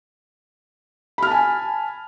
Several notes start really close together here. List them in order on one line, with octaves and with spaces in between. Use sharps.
B5 F6 A5 G#5